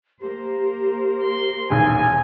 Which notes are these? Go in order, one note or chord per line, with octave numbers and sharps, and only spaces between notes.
A#3 G4 A#4 C5
C6
D#1 B1 E2 G#5